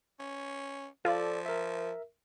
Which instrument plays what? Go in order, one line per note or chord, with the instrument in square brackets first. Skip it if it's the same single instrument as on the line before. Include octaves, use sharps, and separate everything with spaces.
[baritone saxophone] C#4
[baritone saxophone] F3 [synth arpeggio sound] F4 [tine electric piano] A4 D5
[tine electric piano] A#4 E5